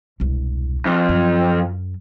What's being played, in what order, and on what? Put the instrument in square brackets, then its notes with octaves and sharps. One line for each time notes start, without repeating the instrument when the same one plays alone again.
[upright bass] E1 C2
[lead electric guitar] F2
[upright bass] F#2